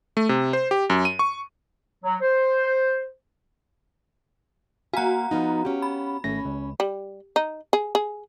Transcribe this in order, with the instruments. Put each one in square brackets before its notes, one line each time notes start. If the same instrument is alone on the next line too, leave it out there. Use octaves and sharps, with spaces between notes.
[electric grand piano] A3
C3
C5
G4
F#2
D#7
C#6
[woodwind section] F#3
C5
[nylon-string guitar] A#3 G#5 [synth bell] F#4 A#5 [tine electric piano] F5 F#5
[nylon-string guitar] F3 B3 D#4
C#4 G4
[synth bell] B5
[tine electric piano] G#1 A3 A#6 [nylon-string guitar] C#4
[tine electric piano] C#2
[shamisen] G3
D#4
G#4
G#4